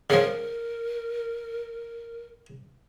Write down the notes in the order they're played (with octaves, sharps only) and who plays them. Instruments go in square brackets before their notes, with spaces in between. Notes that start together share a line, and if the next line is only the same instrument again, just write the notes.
[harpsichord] C#3 F3 [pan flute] A#4